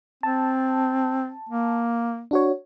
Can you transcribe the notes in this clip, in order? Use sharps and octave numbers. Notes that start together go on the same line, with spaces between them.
C4 A5
A#3
D4 F#4 C#5